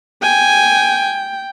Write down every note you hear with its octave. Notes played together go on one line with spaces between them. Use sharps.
G5 G#5